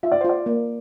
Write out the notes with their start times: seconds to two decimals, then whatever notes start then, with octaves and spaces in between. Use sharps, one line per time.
0.03 F4 E5
0.12 D5
0.21 C5
0.25 F4 D5
0.46 A#3